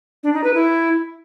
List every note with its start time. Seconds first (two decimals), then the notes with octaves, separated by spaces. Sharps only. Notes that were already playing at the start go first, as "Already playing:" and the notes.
0.23 D4
0.33 D#4
0.44 B4
0.54 E4